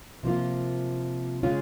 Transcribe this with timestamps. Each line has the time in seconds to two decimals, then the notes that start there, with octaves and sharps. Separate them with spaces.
0.23 C3 F3 A#3 F4
1.43 C#3 G#3 C#4 F4